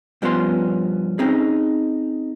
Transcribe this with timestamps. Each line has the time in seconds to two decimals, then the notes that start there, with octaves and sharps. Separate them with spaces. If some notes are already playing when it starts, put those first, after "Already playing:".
0.22 G2 F3 B3 C#4 C6
1.19 C4 C#4 D#4 G#4